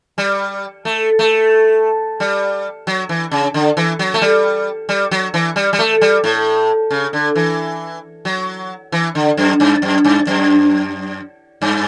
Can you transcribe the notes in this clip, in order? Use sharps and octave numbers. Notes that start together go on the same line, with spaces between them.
G3
A3
A3
G3
F#3
E3
C#3
D3
E3
F#3
A3
G3
G3
F#3
E3
G3
G3
A3
G3
A2
C#3
D3
E3
F#3
E3
D3
F#2
G2
F#2
G2
F#2
G2